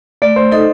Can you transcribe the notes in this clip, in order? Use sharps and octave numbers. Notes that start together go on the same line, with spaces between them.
A3 D5
C5
D#4 A4 D#5